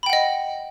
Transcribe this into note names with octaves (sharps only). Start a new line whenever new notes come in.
D#5 F#5 G5 B5